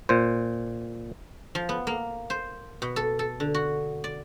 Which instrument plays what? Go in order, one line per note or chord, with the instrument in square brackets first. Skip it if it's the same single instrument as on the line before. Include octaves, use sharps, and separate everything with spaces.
[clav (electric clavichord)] A#2 C5
[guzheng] F3
B3
A#3
C5
B2
A4
A4
D3
F#4
D5